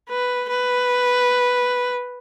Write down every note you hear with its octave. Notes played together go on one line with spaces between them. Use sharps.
B4
B4